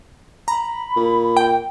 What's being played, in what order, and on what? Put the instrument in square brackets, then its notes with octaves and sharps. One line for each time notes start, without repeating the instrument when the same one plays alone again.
[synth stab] A#5 [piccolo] B5
[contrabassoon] A#2
[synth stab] G5